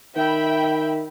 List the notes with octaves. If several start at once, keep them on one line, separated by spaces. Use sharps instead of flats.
D#3 E5 G5 B5